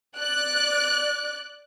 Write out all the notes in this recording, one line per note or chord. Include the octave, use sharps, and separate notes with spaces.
D5 F#6